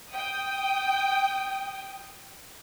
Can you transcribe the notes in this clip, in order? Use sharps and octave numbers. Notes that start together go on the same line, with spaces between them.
G5 D#6